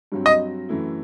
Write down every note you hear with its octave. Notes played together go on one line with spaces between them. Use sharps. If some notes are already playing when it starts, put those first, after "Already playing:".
G2 F#3 C4
D#5
F#2 E3 A3 E4